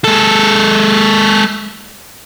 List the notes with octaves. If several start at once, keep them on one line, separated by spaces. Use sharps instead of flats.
G#3 A4